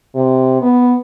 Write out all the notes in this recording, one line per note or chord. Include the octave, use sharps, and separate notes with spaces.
C3
B3